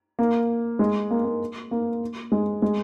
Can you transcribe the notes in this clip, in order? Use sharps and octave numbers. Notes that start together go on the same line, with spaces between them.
A#3
G#3
A#3
A#3
A#3
G#3
G#3